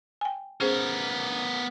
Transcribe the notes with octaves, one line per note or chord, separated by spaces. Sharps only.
G5 G#5
B3 C#4 G#4 A#4 C5